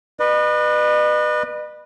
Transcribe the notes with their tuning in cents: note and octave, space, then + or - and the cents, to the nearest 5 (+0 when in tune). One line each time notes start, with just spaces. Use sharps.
B4 -10 D#5 -45